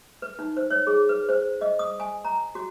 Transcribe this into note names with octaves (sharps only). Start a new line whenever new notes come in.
B4
D#4
C5
C#5
G#4
B4
C5
D#5
D#6
G#5
A#5
F#4